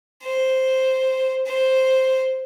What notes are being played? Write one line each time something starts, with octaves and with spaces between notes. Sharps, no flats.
C5
C5